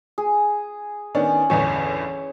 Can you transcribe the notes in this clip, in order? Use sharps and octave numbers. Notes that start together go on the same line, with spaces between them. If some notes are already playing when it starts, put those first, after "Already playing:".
G#4
D#3 B3 C#4 D4
G1 E2 A2 C#5